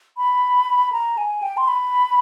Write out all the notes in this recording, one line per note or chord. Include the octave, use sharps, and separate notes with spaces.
B5
A#5
G#5
G5
C6
B5